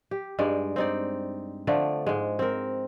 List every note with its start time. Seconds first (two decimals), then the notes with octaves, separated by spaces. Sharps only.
0.11 G4
0.39 G2 G#3 D#4 D5
0.76 C4 D#4 D5
1.67 D3 F3 A3 D5
2.07 G#2 G#3
2.39 C4 A#4